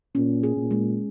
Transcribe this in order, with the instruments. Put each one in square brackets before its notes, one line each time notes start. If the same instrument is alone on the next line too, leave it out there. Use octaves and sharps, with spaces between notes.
[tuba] A#2 [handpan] C#4
[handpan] G#4
[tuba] A#2
[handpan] G#3